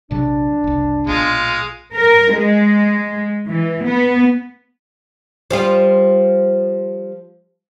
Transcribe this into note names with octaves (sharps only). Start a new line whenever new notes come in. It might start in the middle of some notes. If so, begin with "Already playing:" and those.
A#1 C3 F#3 D4
F#1 C2
B1 A#2 G#3 F4
A#4
G#3
E3
B3
F3 G3 F4